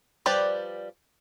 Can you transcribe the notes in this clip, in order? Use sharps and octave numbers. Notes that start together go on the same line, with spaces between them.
F3 G3 G4 B4 D5